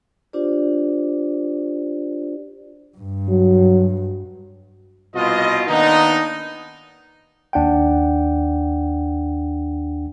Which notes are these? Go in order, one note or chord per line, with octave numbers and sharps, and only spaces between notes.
D4 F4 G4 C5 D5
G2
F#3
C2 B2 F4 D#5
D#3 A#3 B3 D4 D#4
D#2 D4 F#5 G5